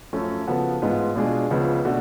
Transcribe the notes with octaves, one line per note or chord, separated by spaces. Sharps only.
F#2 F3 A3 C#4
C#3 F3 B3 F#4 A4
A1 G#2 G#3 B3 F4
B2 G#3 D4 F4 G#4
C#2 C#3 F3 B3
B2 A3 D4 F#4